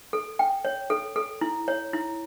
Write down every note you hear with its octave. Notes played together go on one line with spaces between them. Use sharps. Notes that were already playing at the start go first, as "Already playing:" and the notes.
A4
G5
C#5
A4
A4
E4
C#5
E4